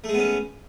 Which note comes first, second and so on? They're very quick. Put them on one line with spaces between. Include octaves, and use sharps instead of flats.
A3 G#3 B3 C#4